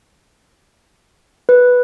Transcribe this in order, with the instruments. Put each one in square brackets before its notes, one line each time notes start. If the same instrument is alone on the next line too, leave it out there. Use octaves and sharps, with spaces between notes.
[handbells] B4